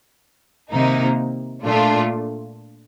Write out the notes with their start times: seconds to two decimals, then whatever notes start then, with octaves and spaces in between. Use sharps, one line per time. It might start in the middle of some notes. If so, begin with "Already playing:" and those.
0.71 C3 D#3 A#3 D#4
1.65 A#2 A3 D4 F4